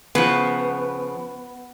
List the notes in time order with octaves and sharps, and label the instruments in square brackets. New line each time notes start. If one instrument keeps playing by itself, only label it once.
[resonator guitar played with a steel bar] C#3 F3 [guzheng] B3